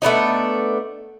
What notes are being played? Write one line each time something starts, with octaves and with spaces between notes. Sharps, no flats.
A3 B3 D4 D#4